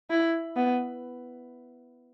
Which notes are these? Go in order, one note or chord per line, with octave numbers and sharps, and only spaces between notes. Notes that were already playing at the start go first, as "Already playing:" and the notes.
E4
B3